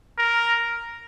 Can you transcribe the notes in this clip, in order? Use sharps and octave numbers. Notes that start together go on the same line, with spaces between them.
A#4